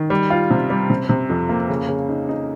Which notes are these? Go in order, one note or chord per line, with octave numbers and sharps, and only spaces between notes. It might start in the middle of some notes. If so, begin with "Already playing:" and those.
Already playing: D#3
G3
F4
C3
G3
C3
C3
F2
A#3
C#3
C#3
D#4
D#4